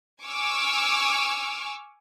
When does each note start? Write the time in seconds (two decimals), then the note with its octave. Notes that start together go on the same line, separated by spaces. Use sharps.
0.24 G#5 C#6 D6 E6 F6